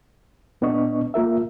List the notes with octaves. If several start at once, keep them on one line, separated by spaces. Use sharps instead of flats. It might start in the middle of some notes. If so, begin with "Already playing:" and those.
A#2 B3 D4 D#5 C#6
A#3 F4 A#4 E5